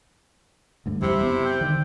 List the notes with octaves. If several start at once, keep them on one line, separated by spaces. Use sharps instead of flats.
D2 G2 D3
F2 C3 F3 G3 E4
F#1 B3
G5
D3 D#3